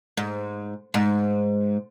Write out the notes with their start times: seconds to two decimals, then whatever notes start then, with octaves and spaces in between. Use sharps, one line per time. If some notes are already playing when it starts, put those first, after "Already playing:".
0.17 G#2
0.94 G#2